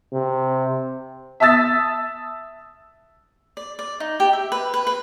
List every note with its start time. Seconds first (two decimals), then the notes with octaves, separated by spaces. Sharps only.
0.13 C3
1.40 E5 A5 D#6 E6 A6 B6
3.57 D5
3.79 D5
4.00 D#4
4.20 G4
4.33 E5
4.52 B4
4.74 B4
4.87 B4